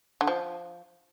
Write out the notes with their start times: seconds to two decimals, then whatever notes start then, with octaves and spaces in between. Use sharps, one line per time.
0.21 D3
0.27 F3